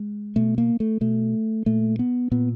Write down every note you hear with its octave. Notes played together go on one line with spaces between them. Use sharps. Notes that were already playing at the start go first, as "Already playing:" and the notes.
Already playing: G#3
B2 A3
A#3
A3
B2 A3
A#2 A3
B3
A#2 B3